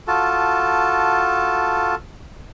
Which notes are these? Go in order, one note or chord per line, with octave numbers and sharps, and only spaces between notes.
F4 F#4 A4 A5